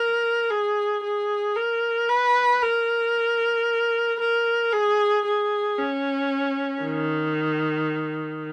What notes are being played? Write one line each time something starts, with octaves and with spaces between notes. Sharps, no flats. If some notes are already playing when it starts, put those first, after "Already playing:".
Already playing: A#4
G#4
G#4
A#4
B4
A#4
A#4
G#4
G#4
C#4
D#3